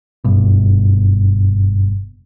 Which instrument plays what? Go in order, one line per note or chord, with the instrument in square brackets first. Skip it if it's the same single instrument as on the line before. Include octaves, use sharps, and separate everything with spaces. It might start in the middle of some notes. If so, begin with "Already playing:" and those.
[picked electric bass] F#1 G2 B2